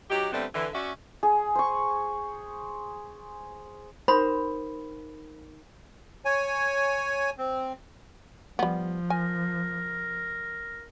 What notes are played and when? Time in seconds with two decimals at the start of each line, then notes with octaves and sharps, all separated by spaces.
0.09 F#3 D#4 G4
0.32 D3 G3 A3 B3 C4
0.53 D3 E3
0.74 C#4 F#4 D5 E5
1.23 G#4
1.55 C5 C#6
4.08 D#4 A#4 C5 B5
6.25 C#5 G#5
7.38 C4
8.59 F3 G3 B3
9.10 A#4 G#5